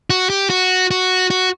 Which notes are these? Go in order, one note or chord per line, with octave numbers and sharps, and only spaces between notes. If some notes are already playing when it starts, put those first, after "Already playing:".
F#4
G4
F#4
F#4
F#4